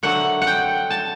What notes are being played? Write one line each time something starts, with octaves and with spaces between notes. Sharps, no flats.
D3 F#3 A3 F#5
F#5
G5
A5